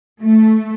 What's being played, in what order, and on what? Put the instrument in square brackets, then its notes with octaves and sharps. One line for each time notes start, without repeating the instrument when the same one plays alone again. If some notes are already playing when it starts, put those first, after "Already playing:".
[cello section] A3